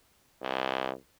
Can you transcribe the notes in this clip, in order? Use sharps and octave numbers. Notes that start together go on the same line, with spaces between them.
C2